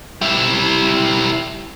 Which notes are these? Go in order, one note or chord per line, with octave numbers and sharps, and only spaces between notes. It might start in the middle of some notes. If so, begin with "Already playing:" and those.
G3 E4